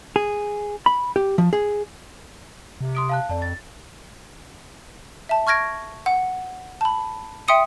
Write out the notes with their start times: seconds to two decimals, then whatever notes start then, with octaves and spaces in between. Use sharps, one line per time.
0.16 G#4
0.86 B5
1.16 G4
1.38 F3
1.53 G#4
2.81 C3
2.95 C6 D#6 D7
3.09 F5 A5 F#6
3.30 F2 D5 A5
3.42 A6
5.29 E5 A5
5.47 C#6 F6 G#6 A#6 D7
6.06 F#5
6.81 A5 B5
7.48 E5 G5 C6 D#6 C#7 D#7